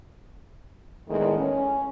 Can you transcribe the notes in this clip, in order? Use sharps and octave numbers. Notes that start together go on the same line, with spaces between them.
E2 A2 D#3 G#3 A3
C#4